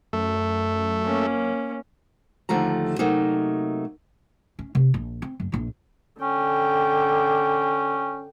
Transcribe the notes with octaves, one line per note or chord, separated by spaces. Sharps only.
F#2 A3
A#3 C#4
D#2 D3 F3 A3 A#5
C3 F#3 A3 A#3 D#4
C#4
C3 C#4
A#1
C4
F#1
A#1 F4
D3 C#4 G5